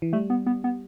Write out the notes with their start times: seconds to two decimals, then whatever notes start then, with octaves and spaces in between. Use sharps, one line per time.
0.02 E3
0.13 G3 A3
0.30 B3
0.46 B3
0.64 B3